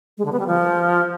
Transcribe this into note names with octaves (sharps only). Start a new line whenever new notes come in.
G#3
D3
B3
G3
F3